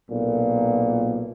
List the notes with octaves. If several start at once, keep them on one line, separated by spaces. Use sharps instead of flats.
B1 A#2